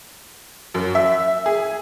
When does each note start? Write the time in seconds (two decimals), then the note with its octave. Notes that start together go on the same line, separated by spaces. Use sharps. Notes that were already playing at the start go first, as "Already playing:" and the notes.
0.74 F#2
0.95 E5
1.46 G#4